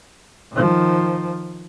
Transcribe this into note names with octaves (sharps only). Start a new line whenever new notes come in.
D#3 F3